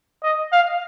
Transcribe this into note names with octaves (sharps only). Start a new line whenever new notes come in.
D#5
F5